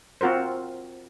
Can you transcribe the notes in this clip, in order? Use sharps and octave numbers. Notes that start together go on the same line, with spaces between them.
C4 F4 F#4 A#4 C5